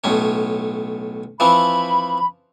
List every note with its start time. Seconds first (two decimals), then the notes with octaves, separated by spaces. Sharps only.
0.04 B1 A2 C#4
1.40 E3 F3 C4 B5